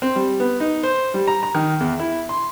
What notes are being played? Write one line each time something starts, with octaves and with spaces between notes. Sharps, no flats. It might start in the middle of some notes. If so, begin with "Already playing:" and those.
C4
G3
B3
D#4
C5
G3
A#5
A#5
D#3
E2
E4
C6